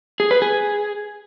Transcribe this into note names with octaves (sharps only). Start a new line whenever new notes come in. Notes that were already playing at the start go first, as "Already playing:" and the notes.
G#4
B4
G#4